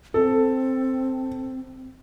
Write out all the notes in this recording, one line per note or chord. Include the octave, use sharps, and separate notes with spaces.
C4 A4